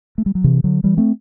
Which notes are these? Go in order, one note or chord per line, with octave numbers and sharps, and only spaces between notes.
A3
G3
F#3
C3 E3
D3 F#3
E3 G3
A3 C4